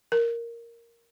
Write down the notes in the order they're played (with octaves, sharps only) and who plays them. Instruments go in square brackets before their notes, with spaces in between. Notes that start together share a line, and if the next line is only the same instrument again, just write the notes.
[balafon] A#4